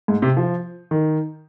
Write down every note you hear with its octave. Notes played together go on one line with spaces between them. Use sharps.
G#2
C3
F3
D#3